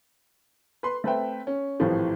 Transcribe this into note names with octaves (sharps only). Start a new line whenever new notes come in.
B4 C6
A3 C4 B4 C5 E5 G5
C#4
G#1 A2 E3 F3 G3